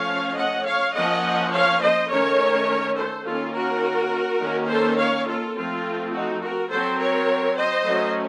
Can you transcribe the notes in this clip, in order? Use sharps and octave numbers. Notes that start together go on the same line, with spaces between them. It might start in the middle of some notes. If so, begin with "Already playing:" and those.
Already playing: F3 A3 C#4 C#5 F5
D#5 F#5
C#5 F5
F3 A#3 C#4 D#5 F#5
C#5 F5
C5 D#5
D#3 A3 C#4 A#4 C#5
A4 C5
D#3 A#3 C#4 F4 A4
F#4 A#4
D#3 A#3 C#4
A4 C5
C#5 F5
F4 A4
F3 A3 C4 F4
D#4 F#4
F#4 A#4
F#3 C4 A4 C5
A#4 C#5
C5 D#5
F#3 A3 C#4